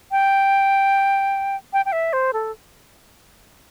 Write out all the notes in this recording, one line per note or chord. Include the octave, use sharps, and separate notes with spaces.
G5
G5
G5
E5
C5
A4